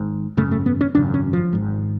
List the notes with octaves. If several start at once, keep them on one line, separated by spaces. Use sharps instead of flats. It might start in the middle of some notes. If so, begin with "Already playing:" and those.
Already playing: G#1 G#2
G#1 F#2 C#3 A3
A3
B3
C#4
G#1 F#2 C#3 D4
C#4
F3
G#1 G#2